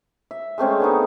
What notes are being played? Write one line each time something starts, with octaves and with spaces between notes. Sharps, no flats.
E5
G#3 A3 C4 C#4
D3 B3 D#4